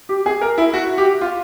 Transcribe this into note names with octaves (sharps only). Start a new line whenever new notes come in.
G4
G#4
A#4
E4
F#4
G4
F4